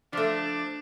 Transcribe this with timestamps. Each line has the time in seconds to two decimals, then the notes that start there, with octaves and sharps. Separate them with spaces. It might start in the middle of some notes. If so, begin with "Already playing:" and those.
0.13 F3 A3 D4